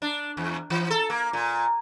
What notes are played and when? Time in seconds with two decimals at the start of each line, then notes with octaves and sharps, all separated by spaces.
0.02 D4
0.37 E2
0.70 E3
0.90 A4
1.10 A#3
1.33 A#2